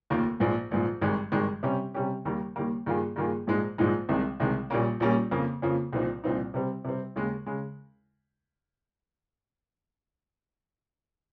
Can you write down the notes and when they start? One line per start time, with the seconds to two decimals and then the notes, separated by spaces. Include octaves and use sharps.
0.10 F1 D#2 D#3 A#3 F4
0.40 A#1 G#2 F3
0.71 A#1 G#2 F3
1.02 G#1 G2 D#3 G#3
1.32 G#1 G2 D#3 G#3
1.63 C3 G3 C#4 G4
1.94 C3 G3 C#4 G4
2.25 D#2 D#3 G3 A#3
2.56 D#2 D#3 G3 A#3
2.86 G2 D#3 A#3 F4 G#4
3.16 G2 D#3 A#3 F4 G#4
3.47 A#1 G#2 F3 G#3 D#4
3.78 A#1 G#2 F3 G#3 D#4
4.09 C2 C3 D#3 G#3
4.40 C2 C3 D#3 G#3
4.70 A#1 A#2 G3 A#3 C#4
5.00 A#1 A#2 G3 A#3 C#4
5.31 F2 C#3 F3 A#3
5.62 F2 C#3 F3 A#3
5.93 C2 A#2 F3 C4 D#4
6.24 C2 A#2 F3 C4 D#4
6.54 C3 G3 C4
6.84 C3 G3 C4
7.16 D#2 C#3 G#3
7.46 C#3 G#3